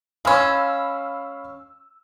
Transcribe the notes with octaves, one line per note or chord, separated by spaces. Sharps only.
G#3 C#4 F5 B5 E6